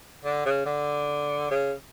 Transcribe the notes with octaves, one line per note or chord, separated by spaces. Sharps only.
D3
C#3
D3
C#3